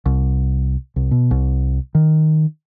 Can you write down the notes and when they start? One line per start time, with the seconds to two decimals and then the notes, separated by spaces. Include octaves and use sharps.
0.06 C2
0.96 C2
1.11 B2
1.31 C2
1.95 D#3